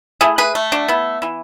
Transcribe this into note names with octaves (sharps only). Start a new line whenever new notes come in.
A3 E4 G#4
G#4 B4
A3
D4 F#4
B3 E4
E3 E4